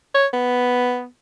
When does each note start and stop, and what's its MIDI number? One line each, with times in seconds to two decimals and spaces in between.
0.14 0.27 73
0.33 1.05 59